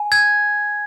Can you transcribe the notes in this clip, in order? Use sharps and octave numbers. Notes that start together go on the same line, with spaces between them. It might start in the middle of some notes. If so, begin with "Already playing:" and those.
Already playing: G#5
G#6